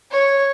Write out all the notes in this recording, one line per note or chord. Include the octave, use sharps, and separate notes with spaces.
C#5